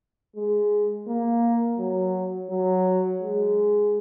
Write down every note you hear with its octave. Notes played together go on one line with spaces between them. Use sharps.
G#3
A#3
F#3
F#3
G#3